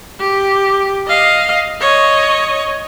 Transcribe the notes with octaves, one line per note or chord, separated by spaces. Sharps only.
G4
D#5 F5
C#5 D#5